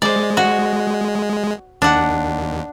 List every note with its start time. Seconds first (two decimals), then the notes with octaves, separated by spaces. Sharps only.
0.02 G#3 C5 D5
0.37 F#4
1.82 D#2 D4 F#5